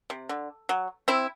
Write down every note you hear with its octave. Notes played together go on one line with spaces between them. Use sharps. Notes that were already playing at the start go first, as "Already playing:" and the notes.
C3
D3
F#3
C4 E4